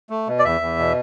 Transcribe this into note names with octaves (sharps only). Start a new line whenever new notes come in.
A3
B2
D5
E2 E5
E2
B2